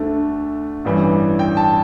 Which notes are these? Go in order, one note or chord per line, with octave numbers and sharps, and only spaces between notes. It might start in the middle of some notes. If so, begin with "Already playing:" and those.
Already playing: D2 D3 A3
A1 G2 E3 G3
G5
A5